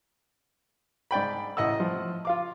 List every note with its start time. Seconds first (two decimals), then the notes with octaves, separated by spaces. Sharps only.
1.11 G#2 D5 G5 B5
1.57 A1 D#5 F#5 E6
1.80 F3
2.25 F4 F5 D6